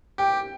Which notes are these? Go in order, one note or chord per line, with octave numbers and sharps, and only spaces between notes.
G4 G5